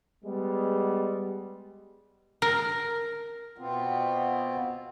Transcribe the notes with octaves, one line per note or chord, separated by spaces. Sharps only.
G3 G#3 B3
A#4
B2 B3 C4 F4